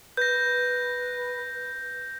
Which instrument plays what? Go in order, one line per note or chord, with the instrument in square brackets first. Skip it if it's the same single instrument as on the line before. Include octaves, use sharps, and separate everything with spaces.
[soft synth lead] B4 [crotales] G6 A#6